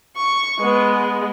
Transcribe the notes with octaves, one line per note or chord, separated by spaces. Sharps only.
C#6
G#3 B3